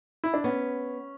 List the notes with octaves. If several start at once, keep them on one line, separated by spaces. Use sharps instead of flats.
E4
D4
B3 C#4